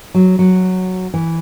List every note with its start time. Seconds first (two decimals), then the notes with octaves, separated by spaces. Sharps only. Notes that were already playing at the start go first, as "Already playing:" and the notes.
0.14 F#3
0.39 F#3
1.14 E3